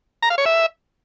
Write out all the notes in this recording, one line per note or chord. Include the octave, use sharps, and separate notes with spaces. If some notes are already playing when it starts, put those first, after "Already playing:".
A#5
F5
C#5
E5